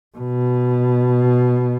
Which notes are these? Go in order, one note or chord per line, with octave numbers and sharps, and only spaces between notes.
B2